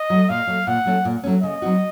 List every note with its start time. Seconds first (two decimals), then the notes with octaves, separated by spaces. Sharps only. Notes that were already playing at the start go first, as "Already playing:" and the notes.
Already playing: D#5
0.10 F#3 A3
0.29 A#2 F5
0.47 F#3 A3
0.67 A#2 F#5
0.86 F#3 A3 C#4
1.05 A#2
1.23 F#3 A3 C#4
1.42 C#3 D#5
1.62 F#3 C4 D#4 F#4